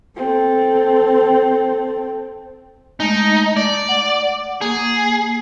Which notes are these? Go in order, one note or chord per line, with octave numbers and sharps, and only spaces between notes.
C4 A4
G#3 A3 D#4
D5
F#5
A#3 G#4